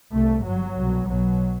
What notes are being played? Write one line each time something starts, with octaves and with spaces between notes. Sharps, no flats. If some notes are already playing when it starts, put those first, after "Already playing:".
C2 C3 A3
G1 G2 F#3
C2 B2
B1 B2 F#3